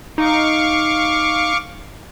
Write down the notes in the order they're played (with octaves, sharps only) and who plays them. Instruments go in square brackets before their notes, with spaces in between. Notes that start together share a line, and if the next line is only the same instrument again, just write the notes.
[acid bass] D#4 [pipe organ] F5 C#6 D6